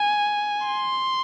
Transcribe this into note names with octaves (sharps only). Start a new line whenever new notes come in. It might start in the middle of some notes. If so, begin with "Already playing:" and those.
Already playing: G#5
C6